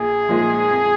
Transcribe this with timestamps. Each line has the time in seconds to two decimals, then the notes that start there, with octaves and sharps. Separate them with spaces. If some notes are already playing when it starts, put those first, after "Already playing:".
Already playing: A#1 G#4
0.29 A#2 F3 G#3 D#4
0.71 F2